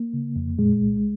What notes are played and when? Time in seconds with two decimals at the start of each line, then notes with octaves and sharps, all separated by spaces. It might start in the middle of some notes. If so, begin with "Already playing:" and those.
Already playing: A#3
0.13 C#3
0.36 F2
0.58 A#2 G#3
0.81 C2